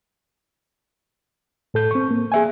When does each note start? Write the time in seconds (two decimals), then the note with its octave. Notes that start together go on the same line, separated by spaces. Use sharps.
1.74 A2 A4 G6
1.91 C4 C#6
2.11 A#3
2.32 G#4 E5 G#5